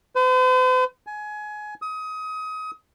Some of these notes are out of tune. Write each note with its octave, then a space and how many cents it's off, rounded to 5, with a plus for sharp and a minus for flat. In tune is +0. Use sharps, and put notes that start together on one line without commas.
C5 -45
G#5 +20
D#6 +25